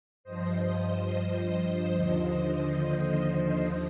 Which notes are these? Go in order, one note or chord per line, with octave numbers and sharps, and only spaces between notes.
G2 F3 C5 D#5
D#2 D3 F3 C5 D#5